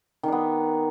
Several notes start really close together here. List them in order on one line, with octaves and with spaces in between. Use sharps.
D#3 D4 B3